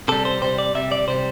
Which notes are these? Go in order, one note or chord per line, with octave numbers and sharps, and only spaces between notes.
C3 G3 A4
C5
C3 G3 C5
D5
C3 G3 E5
D5
C3 G3 C5